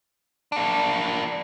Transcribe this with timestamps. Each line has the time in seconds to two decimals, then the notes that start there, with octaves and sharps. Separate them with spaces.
0.52 A#3 D4